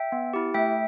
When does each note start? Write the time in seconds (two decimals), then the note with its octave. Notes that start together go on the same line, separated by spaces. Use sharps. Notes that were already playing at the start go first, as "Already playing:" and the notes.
Already playing: E5 G5
0.12 B3
0.34 E4 G4
0.54 A3 E5 G5